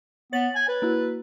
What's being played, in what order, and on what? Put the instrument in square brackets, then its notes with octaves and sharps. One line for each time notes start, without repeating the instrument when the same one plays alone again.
[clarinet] B3 [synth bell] C#5 A6 F#7
[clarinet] G#5
B4
[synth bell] A#3 E4 F#4